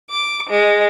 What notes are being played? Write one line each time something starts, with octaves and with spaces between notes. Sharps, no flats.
D6
G#3